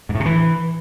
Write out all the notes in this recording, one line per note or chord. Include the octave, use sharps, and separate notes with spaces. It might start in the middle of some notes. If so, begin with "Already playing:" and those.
G#2
A2
C3
E3